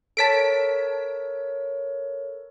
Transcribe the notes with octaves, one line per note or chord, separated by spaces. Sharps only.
A4 A#4 C#5 A5 B6 D7